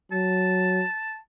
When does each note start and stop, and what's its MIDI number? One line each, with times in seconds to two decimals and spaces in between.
0.12 0.84 54
0.12 1.17 81